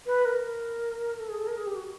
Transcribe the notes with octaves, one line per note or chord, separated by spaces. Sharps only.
B4
A#4
A4
G#4
A4
A#4
G#4
G4
F#4